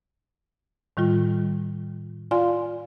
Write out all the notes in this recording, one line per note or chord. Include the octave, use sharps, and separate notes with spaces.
A2 D#3 G3 F4
F4 D5 F5 G#5 C6